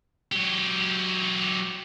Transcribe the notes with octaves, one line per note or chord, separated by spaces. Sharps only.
F#3 G4